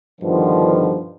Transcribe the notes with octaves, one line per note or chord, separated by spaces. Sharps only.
G2 B2 D3 D#3 F3